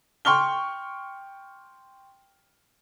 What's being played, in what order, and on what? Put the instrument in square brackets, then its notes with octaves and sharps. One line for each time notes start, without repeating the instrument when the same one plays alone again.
[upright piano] G5 C6 C#6 F6 G7